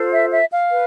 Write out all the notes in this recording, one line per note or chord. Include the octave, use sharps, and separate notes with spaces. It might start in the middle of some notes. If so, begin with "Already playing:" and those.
Already playing: F4 A4 C5
E5
E5
F5
B4